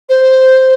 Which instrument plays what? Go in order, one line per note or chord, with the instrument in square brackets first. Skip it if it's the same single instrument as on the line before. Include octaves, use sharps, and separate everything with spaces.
[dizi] C5